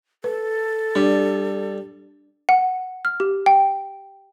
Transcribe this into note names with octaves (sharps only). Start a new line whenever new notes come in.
A4 B4
G3 D4 D5
F#5
F6
G4
G5